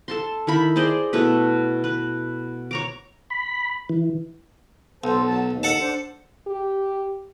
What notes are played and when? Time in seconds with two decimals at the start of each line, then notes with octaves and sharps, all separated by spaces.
0.08 A4 A5 C6
0.47 D#3 E4 B5
0.76 G#4 C5 D5 D#5
1.13 B2 A3 E4 B4
1.84 B4
2.71 C#5 A#5 D6
3.30 B5
3.89 E3
5.04 B1 A4 C5
5.27 F#3 A5
5.47 D#2
5.63 A4 F#5 A5
5.81 D4 C5
6.47 G4